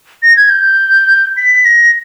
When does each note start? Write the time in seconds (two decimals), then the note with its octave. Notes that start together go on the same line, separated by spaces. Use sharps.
0.23 A#6
0.37 G#6
0.50 G6
1.37 B6
1.65 A#6